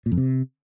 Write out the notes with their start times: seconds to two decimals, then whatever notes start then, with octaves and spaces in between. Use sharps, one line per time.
0.06 A#2
0.12 F2
0.17 C3